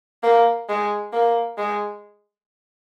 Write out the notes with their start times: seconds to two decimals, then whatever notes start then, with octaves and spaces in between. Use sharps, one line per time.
0.23 A#3
0.69 G#3
1.13 A#3
1.58 G#3